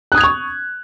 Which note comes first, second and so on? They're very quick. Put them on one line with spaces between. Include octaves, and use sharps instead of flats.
F#6 D#6 G#6 F7 C#6